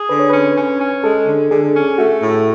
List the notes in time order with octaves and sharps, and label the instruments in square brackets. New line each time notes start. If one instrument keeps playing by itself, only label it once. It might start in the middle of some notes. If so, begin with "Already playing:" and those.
Already playing: [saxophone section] G#4
[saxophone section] D3 [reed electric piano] B4
[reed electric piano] C#5
[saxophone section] C#4 [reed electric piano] B4
[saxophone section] C#4
C#4
[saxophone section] G#3 [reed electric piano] A4
[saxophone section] D3
[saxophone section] D3 [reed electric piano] G#4
[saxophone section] C#4
[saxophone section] A3 [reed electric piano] F#4
[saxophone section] A2